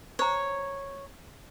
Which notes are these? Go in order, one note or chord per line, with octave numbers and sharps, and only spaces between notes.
C5 C#5 A#5